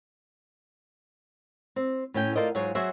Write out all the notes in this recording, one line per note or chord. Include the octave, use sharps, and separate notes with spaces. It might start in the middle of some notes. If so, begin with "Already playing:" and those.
C4
A2 C#4 G5
F4 A4 A#4 C5 D5 D#5
G#2 F#3 F4 G#4 C#5
F#3 F#4 G#4 C5 E5